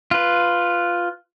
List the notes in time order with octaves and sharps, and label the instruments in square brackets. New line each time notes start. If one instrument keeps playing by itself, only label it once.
[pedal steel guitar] F4 B4